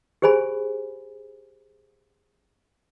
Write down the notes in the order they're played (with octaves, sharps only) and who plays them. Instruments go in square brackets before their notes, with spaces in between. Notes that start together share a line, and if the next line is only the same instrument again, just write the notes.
[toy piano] G4 G#4 C5 G#5 B5